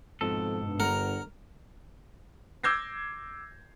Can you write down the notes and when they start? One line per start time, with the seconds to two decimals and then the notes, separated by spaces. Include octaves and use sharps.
0.21 F2 G#2 B2 A4
0.61 G2
0.80 G1 A#4 F#5 A#5
2.64 D6 E6 G6 G#6 A#6 C7